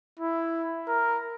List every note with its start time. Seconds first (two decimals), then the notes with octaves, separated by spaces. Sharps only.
0.19 E4
0.88 A#4